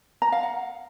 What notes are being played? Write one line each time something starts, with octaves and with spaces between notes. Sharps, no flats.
A#5
F5
F#5